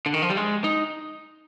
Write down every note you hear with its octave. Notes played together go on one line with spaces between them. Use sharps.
D3
D#3
F3
G3
G#3
D#4